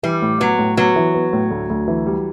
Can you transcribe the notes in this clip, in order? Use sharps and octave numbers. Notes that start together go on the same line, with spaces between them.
E3 G3
A2
F#3 B3
A2
F#3 B3
E3
B3
A2
D2
D2
E3
G3